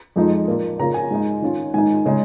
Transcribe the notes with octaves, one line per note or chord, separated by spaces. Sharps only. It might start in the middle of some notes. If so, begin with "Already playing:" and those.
F2 F3 G#3 D#4
A#2 A#3 F4
C#3 A#3 F4 A#5
G#5
G#2 G#3 D#4
D#3 C#4 F4
G#2 D#3 G#3 D#4 G#5
C#3 G#3 D#4